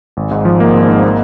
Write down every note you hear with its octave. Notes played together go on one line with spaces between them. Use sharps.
G#1
G#2
F3
A#3
G#1
G#2
A#3